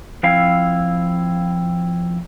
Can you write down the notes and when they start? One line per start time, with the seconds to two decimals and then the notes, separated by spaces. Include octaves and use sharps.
0.23 F3 C4 E4 F5